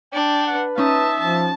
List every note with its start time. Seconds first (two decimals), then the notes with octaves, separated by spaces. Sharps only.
0.13 D4 G5
0.46 B4 F#5
0.78 C#4 D#4 E5 A5 D#6
1.19 F3 A5